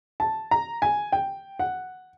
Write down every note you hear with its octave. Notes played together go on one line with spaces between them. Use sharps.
A5
A#5
G#5
G5
F#5